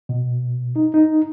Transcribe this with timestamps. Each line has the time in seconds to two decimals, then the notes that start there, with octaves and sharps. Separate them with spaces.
0.09 B2
0.76 D#4
0.94 D#4